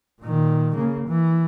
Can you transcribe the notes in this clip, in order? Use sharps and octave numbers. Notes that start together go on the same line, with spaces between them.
A#2 D#3
C#3 A#3
E3